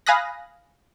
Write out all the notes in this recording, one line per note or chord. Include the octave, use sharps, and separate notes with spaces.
F5 G#5 B5 D#6 F#6 A#6